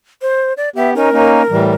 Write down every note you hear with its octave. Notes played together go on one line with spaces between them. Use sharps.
C5
D5
B3 G4 E5
C#4 D#4 A#4
A#3 C#4 D#4
A2 E3 G3